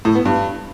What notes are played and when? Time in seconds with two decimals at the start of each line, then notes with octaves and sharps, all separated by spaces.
0.05 A2
0.15 B3
0.25 G2